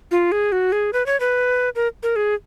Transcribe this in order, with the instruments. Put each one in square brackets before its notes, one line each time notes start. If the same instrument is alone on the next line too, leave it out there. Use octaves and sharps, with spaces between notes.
[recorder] F4
G#4
F#4
G#4
B4
C#5
B4
A#4
A#4
G#4